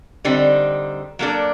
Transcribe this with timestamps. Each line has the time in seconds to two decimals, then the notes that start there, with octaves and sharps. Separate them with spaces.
0.25 D3 G3 C4 D#4
1.19 F#3 A#3 D4 A4